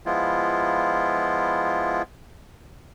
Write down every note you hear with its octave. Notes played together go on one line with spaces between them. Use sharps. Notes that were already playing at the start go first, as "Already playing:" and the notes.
F3 G#3 B3 E4 F4